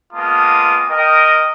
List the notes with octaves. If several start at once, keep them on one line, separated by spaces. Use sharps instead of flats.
G#3 A#3 B3 F4 A5 D#6
A#4 D#5 G5